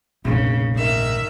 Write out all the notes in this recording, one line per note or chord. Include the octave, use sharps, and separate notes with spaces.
F1 A#1 C#3
G#2 D#3 E5